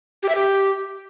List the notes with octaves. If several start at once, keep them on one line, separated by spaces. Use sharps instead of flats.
G4
E5
G4